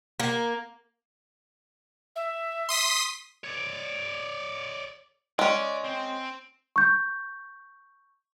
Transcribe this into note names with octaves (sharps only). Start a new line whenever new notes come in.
A#3
E5
C6 D#6 B6
C#5 D5
G#3 C#4 D5
C4
C#6 G6